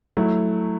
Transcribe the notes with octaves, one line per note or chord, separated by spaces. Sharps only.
F#3 A3 E4